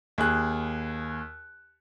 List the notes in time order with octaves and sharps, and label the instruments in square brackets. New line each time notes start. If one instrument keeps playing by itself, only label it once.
[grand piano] D#2 G#4 F#6